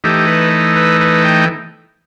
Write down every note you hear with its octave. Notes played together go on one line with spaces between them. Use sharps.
E3 A3 D#4 G4
B4
B4
B4
G5